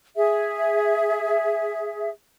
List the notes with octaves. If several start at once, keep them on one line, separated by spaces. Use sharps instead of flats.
G#4 E5